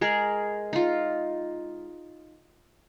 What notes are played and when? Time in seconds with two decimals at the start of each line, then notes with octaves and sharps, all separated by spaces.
0.01 G#3 G#4 A#4
0.73 D#4 F4